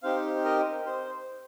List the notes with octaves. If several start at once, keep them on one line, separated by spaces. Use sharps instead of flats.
C4 D#4 G4 C5 F5
A#4 D#5
C5